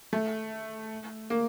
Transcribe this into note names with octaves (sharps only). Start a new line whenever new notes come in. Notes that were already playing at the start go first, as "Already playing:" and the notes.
A3
A#3